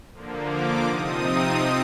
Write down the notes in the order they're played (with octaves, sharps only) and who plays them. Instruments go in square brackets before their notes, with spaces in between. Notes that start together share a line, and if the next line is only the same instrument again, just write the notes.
[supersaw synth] D3 F3 A#3
D6
C3 F3 C4 D#4 D#6